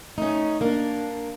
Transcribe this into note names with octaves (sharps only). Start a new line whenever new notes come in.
A3 C#4 D#4
A#3 D4 A#4